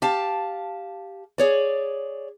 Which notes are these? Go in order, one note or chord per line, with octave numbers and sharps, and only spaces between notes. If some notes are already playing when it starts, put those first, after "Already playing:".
G4 F5 A5
G#4 C#5 D5